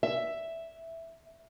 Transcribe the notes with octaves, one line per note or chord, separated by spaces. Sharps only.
E5